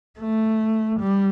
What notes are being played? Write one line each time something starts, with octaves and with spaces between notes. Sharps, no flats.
A3
G3